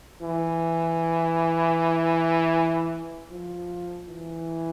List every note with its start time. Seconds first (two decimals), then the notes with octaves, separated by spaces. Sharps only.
0.21 E3
3.30 F3
4.08 E3